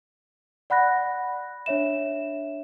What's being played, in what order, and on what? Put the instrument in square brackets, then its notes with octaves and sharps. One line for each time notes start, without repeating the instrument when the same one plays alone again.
[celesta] D5 F#5 B5 F#6 A#6
D4 C#5 E5 E7